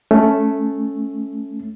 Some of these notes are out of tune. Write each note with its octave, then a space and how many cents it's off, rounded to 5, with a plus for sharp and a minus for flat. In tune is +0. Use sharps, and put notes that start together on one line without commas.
A3 -5 C#4 +0